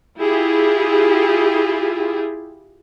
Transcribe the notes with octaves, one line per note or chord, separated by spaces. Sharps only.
E4 F4 G4 G#4